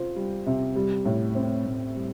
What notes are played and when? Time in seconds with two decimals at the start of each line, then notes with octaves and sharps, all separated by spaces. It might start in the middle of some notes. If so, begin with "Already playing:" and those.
Already playing: C3 F4 C5
0.16 G3
0.46 C3
0.76 G3
1.06 A2
1.35 C4
1.66 A2
1.95 G3